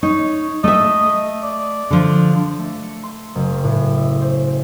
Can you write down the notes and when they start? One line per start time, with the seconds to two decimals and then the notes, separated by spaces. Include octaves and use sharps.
0.03 D#4 C#5
0.64 A3 D#5 E5
1.43 D5
1.91 D3 F3
2.59 A3
2.83 C#7
3.03 C6
3.35 F#1
3.64 A2
3.98 E5
4.21 C5